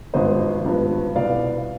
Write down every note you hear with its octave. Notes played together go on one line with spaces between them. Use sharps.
G#1 G2 F3 B3 C5 D#5
G#1 G2 F3 B3
C2 B2 B3 D5 F5